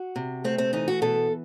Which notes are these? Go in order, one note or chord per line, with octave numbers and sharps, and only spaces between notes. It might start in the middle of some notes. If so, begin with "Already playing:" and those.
Already playing: F#4
C3
A3 C4
C4
E3 D#4
F#4
B2 A4